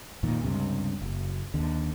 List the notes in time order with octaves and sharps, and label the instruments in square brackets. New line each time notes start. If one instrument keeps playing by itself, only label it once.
[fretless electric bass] F2 A#2 D#3
C#2 G2 C3
F#1
D#2 D3